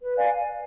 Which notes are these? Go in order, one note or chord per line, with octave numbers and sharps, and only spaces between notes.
B4
D5 F5 G#5